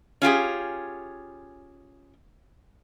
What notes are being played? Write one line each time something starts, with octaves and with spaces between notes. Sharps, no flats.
C#4 F4 G4 G#4